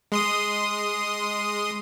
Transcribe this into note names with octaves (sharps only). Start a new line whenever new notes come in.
G#3 C6 D#6